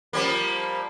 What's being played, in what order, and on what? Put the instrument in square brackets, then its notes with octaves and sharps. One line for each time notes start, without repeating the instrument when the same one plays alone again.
[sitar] F3 G3 A#3